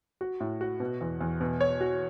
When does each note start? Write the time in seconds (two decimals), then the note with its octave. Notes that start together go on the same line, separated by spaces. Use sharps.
0.21 F#4
0.40 A2
0.61 F#4
0.80 B2
1.01 E2
1.21 E2
1.41 B2
1.60 C#5
1.81 F#4